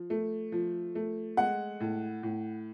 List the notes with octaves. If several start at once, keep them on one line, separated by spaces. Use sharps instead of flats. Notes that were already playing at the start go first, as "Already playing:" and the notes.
Already playing: F3
A3
F3
A3
G#3 F#5
A2
A2